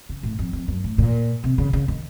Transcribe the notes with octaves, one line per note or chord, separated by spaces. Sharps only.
C#3
A2
F2
F2
F#2
A2
A#2
C3
C#3
C#3
D#3